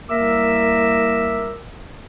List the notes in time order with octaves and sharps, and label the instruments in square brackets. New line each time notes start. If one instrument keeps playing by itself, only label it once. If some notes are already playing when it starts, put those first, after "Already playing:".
[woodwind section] C2 A#3 A#4 E5 D6 E6